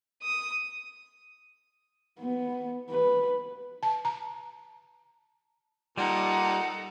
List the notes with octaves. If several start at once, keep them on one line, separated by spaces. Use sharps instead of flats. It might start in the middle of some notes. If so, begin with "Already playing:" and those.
D#6
B3
B4
A5
A#5
A#2 G3 D#4 A4 F#5